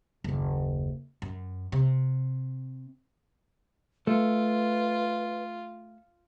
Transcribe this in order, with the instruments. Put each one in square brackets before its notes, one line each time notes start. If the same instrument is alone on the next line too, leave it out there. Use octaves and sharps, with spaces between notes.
[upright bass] F#1 D#2
F#2
C3
[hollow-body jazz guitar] A3 [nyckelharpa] F4 [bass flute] B4